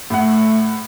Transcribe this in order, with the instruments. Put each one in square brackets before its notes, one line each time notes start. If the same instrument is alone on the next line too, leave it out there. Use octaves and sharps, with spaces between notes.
[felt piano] A2 F#5 [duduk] A3